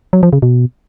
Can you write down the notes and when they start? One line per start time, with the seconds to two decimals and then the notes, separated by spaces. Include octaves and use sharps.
0.13 F#3
0.23 F3
0.33 C#3
0.42 B2